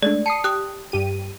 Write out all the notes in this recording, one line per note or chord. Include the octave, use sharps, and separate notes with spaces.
G#3 A3 D4 D5
A5 D#6 C7 C#7
G4 D#6 F#6
G2 G4 D#7